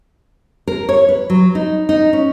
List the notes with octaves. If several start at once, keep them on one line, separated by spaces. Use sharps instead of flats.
A#4
C#5
B4
F#3
D#4
D#4
C#4